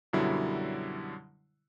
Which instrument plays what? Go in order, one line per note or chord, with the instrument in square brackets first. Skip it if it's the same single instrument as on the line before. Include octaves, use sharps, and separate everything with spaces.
[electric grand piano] F#2 B2 D3 F#3 G3 E4